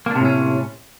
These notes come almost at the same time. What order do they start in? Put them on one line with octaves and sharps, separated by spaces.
A#3 D4 C3 A2 C#4